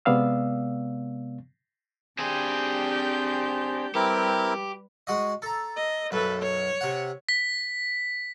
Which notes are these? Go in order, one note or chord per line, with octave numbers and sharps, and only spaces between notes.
C3 G#3 B3 D5 F5 E6
C4 D4 G4 G#4 G6
G3 C4 E4 G4 A#4 B4
G#3 F#4 D#5
A4 A#5
D#5
B1 F#2 A4 B4
C#5
C3 F#5
B6